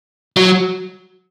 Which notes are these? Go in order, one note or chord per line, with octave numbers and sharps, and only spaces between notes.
F#3